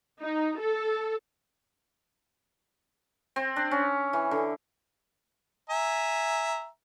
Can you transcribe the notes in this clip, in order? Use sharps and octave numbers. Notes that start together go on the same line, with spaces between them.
D#4
A4
C4
D4
C#4
E3
D3
E5 G#5 A#5